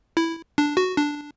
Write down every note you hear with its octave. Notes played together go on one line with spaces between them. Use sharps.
E4
D4
F#4
D4